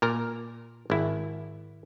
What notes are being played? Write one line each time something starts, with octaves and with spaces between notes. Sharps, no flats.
A#2 A#4 A#5
G#1 E4